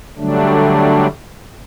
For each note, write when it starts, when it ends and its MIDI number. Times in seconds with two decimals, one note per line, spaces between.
0.18 1.07 50
0.18 1.07 54
0.18 1.07 55
0.18 1.07 57
0.18 1.07 62